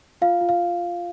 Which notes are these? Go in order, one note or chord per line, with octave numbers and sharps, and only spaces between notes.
F4 F5
F4
F5